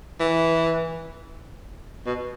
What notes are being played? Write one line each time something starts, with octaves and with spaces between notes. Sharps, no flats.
E3
B2